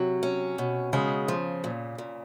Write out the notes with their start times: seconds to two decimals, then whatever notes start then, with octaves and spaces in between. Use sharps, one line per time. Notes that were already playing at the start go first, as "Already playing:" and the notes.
Already playing: C3 F#3
0.23 C#4
0.58 B2
0.93 C#3 G#3
1.28 F3
1.64 A#2
1.98 A#2